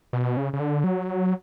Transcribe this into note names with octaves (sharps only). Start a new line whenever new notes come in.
B2
C#3
C#3
D3
F#3